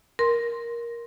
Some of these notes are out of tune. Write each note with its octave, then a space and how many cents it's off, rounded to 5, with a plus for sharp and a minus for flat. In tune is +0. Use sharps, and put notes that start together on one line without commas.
A#4 +10 C6 +0